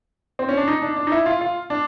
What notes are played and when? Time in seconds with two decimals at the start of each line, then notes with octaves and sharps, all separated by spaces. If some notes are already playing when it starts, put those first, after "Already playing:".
0.39 C4
0.49 C#4
0.57 D4
0.68 D#4
0.82 D4
0.96 D4
1.07 D#4
1.12 E4
1.26 F4
1.41 F4
1.70 D4